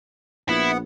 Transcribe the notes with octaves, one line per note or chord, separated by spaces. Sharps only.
A#1 B3 E4 F#5